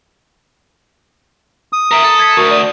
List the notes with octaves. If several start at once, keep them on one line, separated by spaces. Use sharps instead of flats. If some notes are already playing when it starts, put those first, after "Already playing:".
D#6
A#4 E5 A#5 D7
A4
G#6 A6 B6
D2 F#4 A#4 C#6
D5